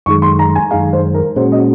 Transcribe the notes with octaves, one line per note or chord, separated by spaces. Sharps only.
F#2 D#3 G#3 C#6
C6
A#5
G#5
F#2 D#3 G#3 F5
C5
A#4
A#2 G#3 C#4 F#4 C5
D#5